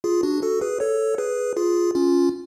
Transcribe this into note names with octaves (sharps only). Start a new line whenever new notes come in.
F4 G#4
D4 F#4
F#4 A4
G#4 B4
A4 C#5
G#4 B4
F4 G#4
C#4 F4